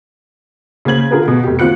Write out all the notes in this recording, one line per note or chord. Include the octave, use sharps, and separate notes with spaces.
C#3 A#3 C5 G#6 F#7
D3 F4 G#4 A#4 B4
B2 B3
F1 G4
D#2 C4 F4 F#6 C#7